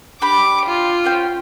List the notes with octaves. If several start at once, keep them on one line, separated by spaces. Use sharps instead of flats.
D4 G4 B5 D6
F4
C#4 C5 G5